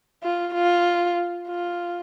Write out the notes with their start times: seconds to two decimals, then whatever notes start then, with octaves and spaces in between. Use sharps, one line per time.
0.23 F4
0.54 F4
1.49 F4